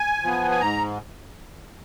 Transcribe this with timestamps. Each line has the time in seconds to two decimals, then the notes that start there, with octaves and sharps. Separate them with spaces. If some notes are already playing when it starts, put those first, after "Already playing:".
Already playing: G#5
0.23 F3 B3
0.51 G#5
0.61 G#2 A#5